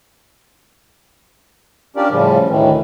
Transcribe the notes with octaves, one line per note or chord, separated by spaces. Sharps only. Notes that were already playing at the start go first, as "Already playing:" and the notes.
C#4 D4 F4 G4 A#4 D5
A2 C#3 F3 G3
D2 A2 D#3 E3